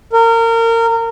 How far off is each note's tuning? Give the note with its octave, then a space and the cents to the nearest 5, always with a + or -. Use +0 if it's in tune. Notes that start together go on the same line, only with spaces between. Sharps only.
A#4 -25